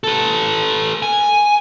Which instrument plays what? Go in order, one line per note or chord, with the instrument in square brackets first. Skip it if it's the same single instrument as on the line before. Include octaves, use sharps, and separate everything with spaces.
[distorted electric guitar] A4 B4
G#5